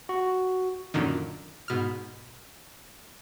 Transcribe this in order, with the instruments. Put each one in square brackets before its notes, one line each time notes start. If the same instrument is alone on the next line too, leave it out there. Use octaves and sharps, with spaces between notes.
[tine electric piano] F#4
[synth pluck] F#2 A#2 D3 D#3
G#2 B2 F6